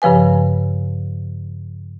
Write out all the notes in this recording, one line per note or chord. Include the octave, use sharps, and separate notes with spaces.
G2 C#3 F3 B4 G#5